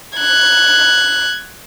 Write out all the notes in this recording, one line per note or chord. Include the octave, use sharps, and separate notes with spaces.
F#6 G#6